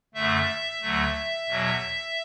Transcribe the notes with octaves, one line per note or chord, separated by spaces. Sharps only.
F#2 D3 A3 E5
D2 D3 F#3 A3
E2 B2 F#3